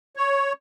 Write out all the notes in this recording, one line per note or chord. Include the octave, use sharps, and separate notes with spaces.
C#5